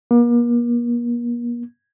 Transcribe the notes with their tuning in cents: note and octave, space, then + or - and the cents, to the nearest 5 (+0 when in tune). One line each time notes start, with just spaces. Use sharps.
A#3 +40